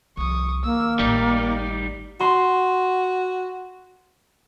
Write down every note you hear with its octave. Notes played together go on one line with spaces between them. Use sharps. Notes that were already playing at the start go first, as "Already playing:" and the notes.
C2 F3 C#6 D#6
D#3 A#3 E6
G#1 A2 G3 D#4 D5
F#4 C6